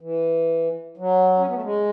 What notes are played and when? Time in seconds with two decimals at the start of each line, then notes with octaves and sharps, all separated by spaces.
0.01 E3
0.97 F#3
1.38 C#4
1.47 B3
1.54 A3
1.62 G#3